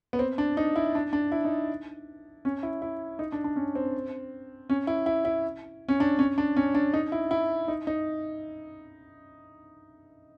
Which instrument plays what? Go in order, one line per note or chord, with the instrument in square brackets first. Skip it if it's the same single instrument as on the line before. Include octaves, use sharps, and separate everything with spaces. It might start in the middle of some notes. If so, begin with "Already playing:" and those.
[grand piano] B3
C4
D4
D#4
E4
D4
D4
E4
D#4
C#4
E4
E4
D#4
D4
D4
C#4
C4
C#4
E4
E4
E4
C#4
D4
C#4
D4
C#4
D4
D#4
E4
E4
D#4
D#4